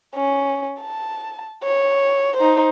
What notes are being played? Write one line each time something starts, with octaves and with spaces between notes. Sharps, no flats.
C#4
A5
C#5
D#4 C5